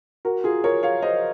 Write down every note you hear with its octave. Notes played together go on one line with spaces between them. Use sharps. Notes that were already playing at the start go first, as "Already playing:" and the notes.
F#4 A#4
F4 G#4
A#4 C#5
C#5 F5
C5 D#5